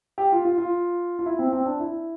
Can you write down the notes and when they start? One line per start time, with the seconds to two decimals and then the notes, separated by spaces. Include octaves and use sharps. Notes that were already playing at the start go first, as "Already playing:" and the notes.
0.18 G4
0.32 F4
0.45 F4
0.58 F4
1.19 F4
1.26 E4
1.39 C4
1.53 C4
1.66 D4
1.80 E4